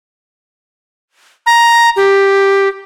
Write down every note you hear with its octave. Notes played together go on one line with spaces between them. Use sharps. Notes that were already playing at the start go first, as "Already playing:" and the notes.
A#5
G4